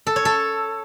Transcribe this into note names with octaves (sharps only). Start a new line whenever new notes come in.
A4
C#5
A4